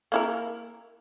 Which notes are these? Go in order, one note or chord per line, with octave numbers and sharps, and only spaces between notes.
A#3 E4 A#4